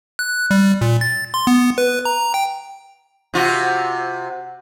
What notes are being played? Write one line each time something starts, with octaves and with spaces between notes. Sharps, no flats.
F#6
G3
A#2
A6
C6
B3
B4
A#5
G5
C3 F4 F#4